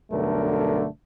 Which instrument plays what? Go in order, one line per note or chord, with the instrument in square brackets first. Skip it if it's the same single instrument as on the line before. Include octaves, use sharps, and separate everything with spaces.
[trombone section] B1 G2 D3 A3 A#4